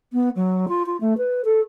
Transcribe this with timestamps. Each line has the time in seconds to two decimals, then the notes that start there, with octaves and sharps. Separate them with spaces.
0.13 B3
0.35 F#3
0.68 F4
0.86 F4
1.00 A3
1.18 B4
1.45 A4